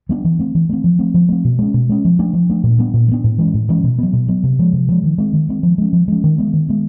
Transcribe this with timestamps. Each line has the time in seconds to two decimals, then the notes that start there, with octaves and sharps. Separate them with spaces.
0.09 G3 B3 D4
0.24 E3
0.39 A3 C4
0.55 E3
0.69 A3 C4
0.84 F3
0.99 A3 C4
1.14 F3
1.29 A3 C4
1.45 B2
1.59 G#3 C#4
1.74 B2
1.89 G#3 C#4
2.05 F3
2.19 A3 D4
2.33 F3
2.50 A3 D4
2.64 A#2
2.79 G3 B3 D4
2.94 A#2
3.08 G3
3.11 B3 D4
3.24 A2
3.38 E3 G#3 C#4
3.54 A2
3.69 E3 G#3 C#4
3.84 B2
3.99 F#3 B3
4.13 B2
4.28 F#3 B3
4.44 C3
4.59 F3 G#3
4.73 C3
4.89 F3 G#3
5.03 D#3
5.18 G#3 C4
5.33 D#3
5.49 G#3 C4
5.63 F3
5.78 G#3 C#4
5.93 F3
6.08 G#3 C#4
6.24 D#3
6.38 G#3 B3
6.53 D#3
6.69 G#3 B3